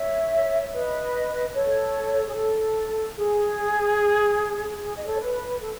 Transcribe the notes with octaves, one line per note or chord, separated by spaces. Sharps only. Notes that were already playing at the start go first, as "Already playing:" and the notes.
Already playing: C#5 E5
B4 D#5
A4 C#5
G#4
A4
G#4
G#4
D#5
A4 C#5
B4
A4